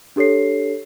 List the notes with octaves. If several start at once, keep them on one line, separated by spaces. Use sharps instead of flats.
D4 G4 A4 C#5 C7